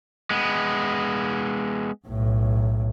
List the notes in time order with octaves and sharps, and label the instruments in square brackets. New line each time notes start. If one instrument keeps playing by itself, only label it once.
[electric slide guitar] G#3 B3
[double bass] B1 A2